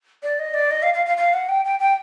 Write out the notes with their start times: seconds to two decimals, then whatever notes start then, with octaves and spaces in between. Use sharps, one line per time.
0.23 D5
0.39 D#5
0.54 D5
0.71 D#5
0.83 F5
0.94 F5
1.06 F5
1.17 F5
1.34 F#5
1.49 G5
1.65 G5
1.80 G5